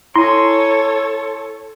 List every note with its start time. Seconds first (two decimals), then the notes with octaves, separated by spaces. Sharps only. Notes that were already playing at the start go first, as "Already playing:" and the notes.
0.16 E4 A4 C#5 G#5 C6